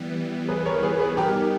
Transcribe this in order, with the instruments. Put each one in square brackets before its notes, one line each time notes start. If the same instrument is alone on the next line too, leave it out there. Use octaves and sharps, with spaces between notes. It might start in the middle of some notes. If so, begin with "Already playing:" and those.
Already playing: [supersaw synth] E3 G3 B3
[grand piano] G#4 B4
A#4 C#5
G#4 B4
G#4 B4
[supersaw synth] G3 B3 D#4 [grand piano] G4 A#4